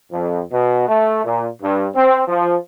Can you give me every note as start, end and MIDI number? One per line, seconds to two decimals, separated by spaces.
0.12 0.39 41
0.51 0.86 47
0.87 1.22 57
1.24 1.46 46
1.60 1.86 43
1.94 2.21 60
2.27 2.54 53